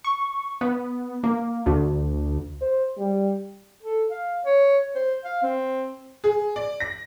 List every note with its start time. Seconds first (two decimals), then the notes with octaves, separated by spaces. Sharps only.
0.04 C#6
0.61 B3
1.23 A#3
1.66 D2
2.61 C5
2.98 G3
3.82 A4
4.11 F5
4.45 C#5
4.95 C5
5.24 F5
5.42 C4
6.24 G#4
6.56 D5
6.80 A#6